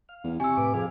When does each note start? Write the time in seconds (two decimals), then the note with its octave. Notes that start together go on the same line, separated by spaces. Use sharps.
0.09 F5
0.24 E2
0.40 C3 G#5 C#6 E6
0.57 A2 B4 D6
0.74 F2 G#4 F5